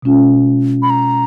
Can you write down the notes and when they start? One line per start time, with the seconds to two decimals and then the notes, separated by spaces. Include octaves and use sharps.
0.03 B2 G#3 C#4 F4
0.82 B5
0.90 A#5